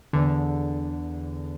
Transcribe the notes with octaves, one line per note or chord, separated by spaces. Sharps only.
E2 D3